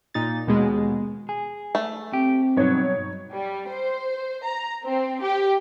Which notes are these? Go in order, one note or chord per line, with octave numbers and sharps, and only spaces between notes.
A#2 D#4 A6
D#2 B2 G#3
G#4
A3
C4 G4
G2 B2 F#3 D#4 C#5
G3
C5
A#5
C4
G4